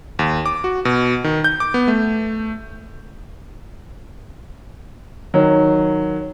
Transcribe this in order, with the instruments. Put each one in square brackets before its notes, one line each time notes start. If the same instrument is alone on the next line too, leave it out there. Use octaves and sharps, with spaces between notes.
[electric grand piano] D#2
D6
F#4
B2
D#3
G6
D6
B3
A3
[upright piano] D#3 F#3